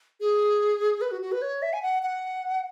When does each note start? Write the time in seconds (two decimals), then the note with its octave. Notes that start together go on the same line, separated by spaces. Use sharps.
0.21 G#4
1.01 B4
1.11 F#4
1.22 F#4
1.32 B4
1.42 C#5
1.62 E5
1.73 G#5
1.82 F#5
2.03 F#5